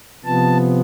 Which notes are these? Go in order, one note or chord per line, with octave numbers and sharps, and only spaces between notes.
C3 F3 B3 A5